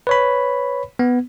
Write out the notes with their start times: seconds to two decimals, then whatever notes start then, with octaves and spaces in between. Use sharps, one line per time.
0.07 B4 C#5 B5
0.99 B3